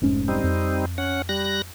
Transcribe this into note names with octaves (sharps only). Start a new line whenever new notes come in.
F1 G#2 C#4
G3 C4 D#4
F2
C#4 F#5
G3 F#6 A#6